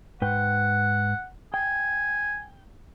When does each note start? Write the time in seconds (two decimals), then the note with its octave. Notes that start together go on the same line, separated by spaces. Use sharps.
0.22 G#2 B4 F#5 G5
1.54 G5 G#5